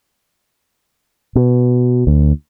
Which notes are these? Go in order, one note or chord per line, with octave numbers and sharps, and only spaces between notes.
B2
D2